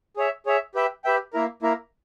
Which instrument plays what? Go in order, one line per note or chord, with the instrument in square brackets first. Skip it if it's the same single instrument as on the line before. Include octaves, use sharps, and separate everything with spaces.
[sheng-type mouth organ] G#4 C#5 E5
G#4 C#5 E5
G4 B4 E5 G5
G4 B4 E5 G5
A#3 E4 A#4
A#3 E4 A#4